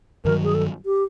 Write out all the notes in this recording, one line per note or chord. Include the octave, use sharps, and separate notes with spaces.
G2 D#3 F#3 A#4
G#4
A4
G4